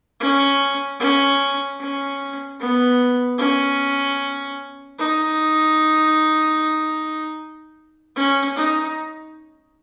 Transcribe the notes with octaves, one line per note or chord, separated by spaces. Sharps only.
C#4
C#4
C#4
B3
C#4
D#4
C#4
D#4